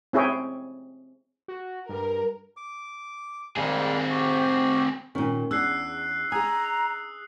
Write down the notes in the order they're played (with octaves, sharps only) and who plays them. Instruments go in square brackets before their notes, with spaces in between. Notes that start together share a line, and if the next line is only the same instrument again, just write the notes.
[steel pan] C4 E4 G#4 C#5 G5
[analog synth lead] F#4
[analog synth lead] G2 [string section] A#4
[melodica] D6
[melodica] G3 G#3 A#3 [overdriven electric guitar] C4 G#4
[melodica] F#4 G4
[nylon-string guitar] A#2 D#3 [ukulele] C#4
[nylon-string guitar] E2 D4 G#4 [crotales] E6 F#6 C7
[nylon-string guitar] G#4 G#5 [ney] A#5 [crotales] D#6